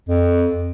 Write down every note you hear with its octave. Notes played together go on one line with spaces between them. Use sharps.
F2